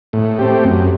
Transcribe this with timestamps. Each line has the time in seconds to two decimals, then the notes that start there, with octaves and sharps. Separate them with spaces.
0.13 A2
0.39 A3 C4 G4
0.64 F#2